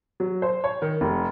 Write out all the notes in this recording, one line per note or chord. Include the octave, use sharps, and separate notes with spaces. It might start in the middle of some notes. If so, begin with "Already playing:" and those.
F#3
C5
C#5
D#3
F1